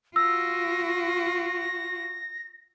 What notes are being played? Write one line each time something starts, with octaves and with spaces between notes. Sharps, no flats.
F4 F#4 E6 A#6